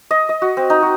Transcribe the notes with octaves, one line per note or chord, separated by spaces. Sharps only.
D#5
D#5
F#4
C4
D#4
F#4